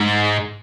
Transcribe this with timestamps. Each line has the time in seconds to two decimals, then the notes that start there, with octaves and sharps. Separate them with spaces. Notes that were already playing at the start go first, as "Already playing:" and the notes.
Already playing: G#2